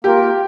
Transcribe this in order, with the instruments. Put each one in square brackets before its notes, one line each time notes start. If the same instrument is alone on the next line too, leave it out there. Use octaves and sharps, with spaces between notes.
[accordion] A#3 F4 A#4 [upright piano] G4